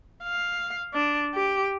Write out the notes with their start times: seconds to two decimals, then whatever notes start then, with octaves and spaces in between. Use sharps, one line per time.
0.24 F5
0.94 D4
1.35 G4